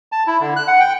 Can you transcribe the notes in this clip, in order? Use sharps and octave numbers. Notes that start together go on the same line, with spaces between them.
A5
E4
D3
F#6
F#5
G5